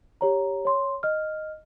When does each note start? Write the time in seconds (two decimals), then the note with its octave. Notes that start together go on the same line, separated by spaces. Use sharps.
0.21 G4 C#5 A#5
0.65 C#5 C6
1.03 D#5 F6